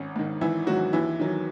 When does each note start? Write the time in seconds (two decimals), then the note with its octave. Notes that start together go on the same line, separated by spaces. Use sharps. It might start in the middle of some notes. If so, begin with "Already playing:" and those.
Already playing: G#1 C#4
0.16 G#2 D#3
0.41 G#1 E3 E4
0.67 G#2 D#3 F#3 F#4
0.93 D#2 E3 E4
1.19 D#3 F#3